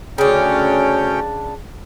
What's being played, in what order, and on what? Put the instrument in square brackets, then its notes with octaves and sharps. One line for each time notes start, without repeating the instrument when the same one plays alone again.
[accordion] D2 C#4 G5 [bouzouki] C#3 D4